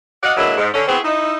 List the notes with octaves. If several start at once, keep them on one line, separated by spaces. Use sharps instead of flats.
F#4 D5 D#5 F5 F#5
D3 F#3 G#3 A#3 E4
G#2
D3 C#4
B3 C4 E4 F#4 G#4 C5
D#4 E4